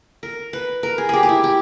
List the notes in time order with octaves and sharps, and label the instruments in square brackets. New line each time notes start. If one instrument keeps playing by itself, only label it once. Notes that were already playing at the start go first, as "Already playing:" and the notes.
[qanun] A#4
B4
A#4
G#4
G4 G#4
G4
E4
G4